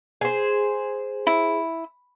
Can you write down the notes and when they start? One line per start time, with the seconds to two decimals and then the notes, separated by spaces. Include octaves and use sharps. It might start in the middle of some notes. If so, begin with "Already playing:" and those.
0.21 G#4 C5
1.27 E4